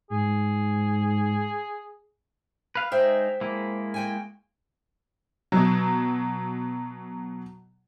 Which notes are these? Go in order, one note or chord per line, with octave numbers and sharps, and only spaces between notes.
G#2 G#4
B4 F5
G#3 D#4 C5 E5 G5
G#3 A#3 E4
F#4 G5 G#5
B2 F#3